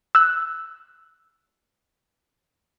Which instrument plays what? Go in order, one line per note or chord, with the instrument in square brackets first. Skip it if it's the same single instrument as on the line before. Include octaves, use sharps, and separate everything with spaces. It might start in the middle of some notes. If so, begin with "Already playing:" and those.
[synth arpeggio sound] E6 F#6